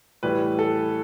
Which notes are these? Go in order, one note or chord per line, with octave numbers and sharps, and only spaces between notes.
A2 E3 G3 B4
A4